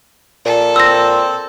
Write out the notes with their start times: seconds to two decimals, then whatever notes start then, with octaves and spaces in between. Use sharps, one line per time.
0.45 A#2 A4
0.76 C4 E6 A#6